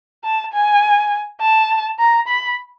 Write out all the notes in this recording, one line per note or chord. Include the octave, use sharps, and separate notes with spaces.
A5
G#5
A5
A#5
B5